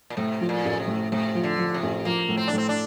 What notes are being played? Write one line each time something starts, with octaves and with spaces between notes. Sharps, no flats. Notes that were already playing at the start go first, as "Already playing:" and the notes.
A#2
A2 C3
F3
A#2
A1
C3
A2
A2 C3
F3
D3
F3
C3
A1
F3 A#3
A2
C4
D4
A2 C4
D4